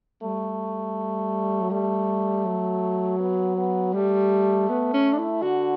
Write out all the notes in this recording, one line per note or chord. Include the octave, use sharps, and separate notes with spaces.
G3 A3
F#3
G3 A3
F#3
B3
B3
G3 A3
B3
C#4
D4
E4
D3 F#4